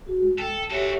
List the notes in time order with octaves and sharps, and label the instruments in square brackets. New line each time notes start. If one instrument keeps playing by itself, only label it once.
[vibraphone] F#4 G#4
G#3
[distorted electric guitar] A4 [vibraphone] G5
[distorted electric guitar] F#4 A4 [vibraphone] G4 C#5 E5